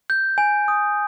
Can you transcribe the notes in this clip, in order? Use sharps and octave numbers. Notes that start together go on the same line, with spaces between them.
G6
G#5
D#6